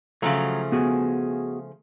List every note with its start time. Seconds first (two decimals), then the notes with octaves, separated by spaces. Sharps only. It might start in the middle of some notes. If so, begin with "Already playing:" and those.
0.22 C#3 F3 F#3 A3 A#5
0.72 B3 F#4 G#4